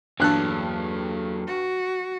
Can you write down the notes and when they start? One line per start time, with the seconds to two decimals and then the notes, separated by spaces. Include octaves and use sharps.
0.20 E2 G2 F#3 A#3 A4 C#5 F#6
1.47 F#4